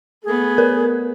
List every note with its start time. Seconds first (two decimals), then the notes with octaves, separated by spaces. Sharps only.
0.24 A3 B3 G#4
0.58 A#4 B4